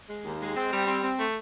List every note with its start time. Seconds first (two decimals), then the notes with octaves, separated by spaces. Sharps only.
0.09 G#3
0.25 D#2
0.40 G#3
0.56 C4
0.72 G3
0.87 C4
1.03 C4
1.19 A3